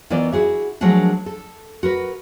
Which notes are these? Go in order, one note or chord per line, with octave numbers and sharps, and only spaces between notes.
D#3 E3 B3 F4 D5
E4 F#4 G#4 E5
F3 F#3 G#3 A3 D4 A#4
A4
F#4 A#4 B4